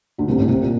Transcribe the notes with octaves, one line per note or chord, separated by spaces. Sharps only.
D2 D3
C2 C3
A1 A2
C2 C3
A#2